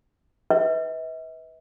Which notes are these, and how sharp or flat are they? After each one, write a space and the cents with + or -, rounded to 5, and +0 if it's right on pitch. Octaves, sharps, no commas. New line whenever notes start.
B4 +0 E5 -45